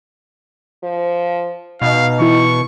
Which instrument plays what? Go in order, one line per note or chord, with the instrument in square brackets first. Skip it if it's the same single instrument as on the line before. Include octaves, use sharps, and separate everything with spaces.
[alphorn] F3
[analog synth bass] B2 [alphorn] D#4 [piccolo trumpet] F5
[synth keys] E3 E4 [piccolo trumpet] C#6